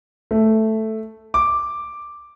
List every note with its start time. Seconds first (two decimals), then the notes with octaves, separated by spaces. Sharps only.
0.31 A3
1.34 D6